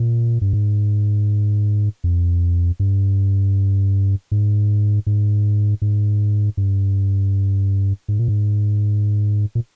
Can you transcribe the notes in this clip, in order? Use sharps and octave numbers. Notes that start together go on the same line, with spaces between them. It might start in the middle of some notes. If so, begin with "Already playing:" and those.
Already playing: A#2
G2
G#2
F2
G2
G#2
G#2
G#2
G2
G#2
A#2
G#2
A#2